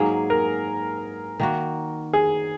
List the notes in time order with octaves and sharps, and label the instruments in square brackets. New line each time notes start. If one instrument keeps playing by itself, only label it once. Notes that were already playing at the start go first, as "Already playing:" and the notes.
Already playing: [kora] G#2 F#3 A#3 [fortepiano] G#4
[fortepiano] A#4
[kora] D#3 A#3 F#4
[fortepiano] G#4